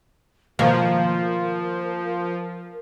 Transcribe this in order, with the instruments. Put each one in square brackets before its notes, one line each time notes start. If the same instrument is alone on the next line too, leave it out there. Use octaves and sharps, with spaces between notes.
[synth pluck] B2 D#3 [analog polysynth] F3 [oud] A#3 [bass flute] A#4